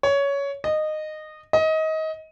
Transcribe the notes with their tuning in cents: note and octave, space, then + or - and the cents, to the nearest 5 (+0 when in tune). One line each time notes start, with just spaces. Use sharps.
C#5 +15
D#5 -15
D#5 +25